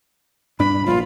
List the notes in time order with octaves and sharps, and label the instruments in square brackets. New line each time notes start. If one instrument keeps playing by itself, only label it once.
[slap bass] G2 D4 [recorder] B5
[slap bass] E1 A#1 [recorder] F4